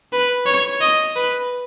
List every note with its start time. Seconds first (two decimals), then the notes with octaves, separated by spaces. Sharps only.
0.13 B4
0.46 C#5
0.81 D#5
1.16 B4